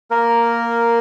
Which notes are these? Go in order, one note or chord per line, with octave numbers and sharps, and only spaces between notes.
A#3 A#4